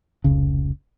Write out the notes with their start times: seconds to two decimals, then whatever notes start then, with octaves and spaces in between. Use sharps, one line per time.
0.24 F1 C#2 C#3